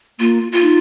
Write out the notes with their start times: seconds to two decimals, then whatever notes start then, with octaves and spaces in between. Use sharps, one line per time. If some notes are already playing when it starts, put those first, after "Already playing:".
0.20 A#3 F4
0.52 F4
0.62 D#4